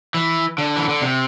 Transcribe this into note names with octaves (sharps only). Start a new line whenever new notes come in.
E3
D3
E3
D3
C3